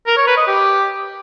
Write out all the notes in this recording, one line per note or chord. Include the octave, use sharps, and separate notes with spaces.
A#4
C#5
B4
D#5
G4